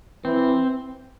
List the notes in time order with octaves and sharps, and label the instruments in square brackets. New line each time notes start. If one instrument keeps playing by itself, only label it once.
[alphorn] E3 [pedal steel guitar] C4